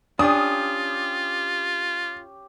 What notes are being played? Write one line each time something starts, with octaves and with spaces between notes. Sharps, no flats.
C#4 D4 F4 G4 D#6